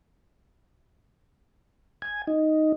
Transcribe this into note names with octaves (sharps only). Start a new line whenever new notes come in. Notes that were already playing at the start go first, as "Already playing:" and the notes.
G#5
D#4